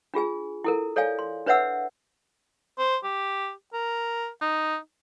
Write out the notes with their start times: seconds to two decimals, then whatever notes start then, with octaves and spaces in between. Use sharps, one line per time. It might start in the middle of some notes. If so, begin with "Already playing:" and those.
0.14 D4 F4 G#4 G#5
0.64 E4 A4 A#4
0.96 A4 C#5 D5 F5 G#5
1.19 C6
1.46 D4 B4 C#5 E5 F#5 E6
2.78 C5
3.04 G4
3.73 A#4
4.42 D#4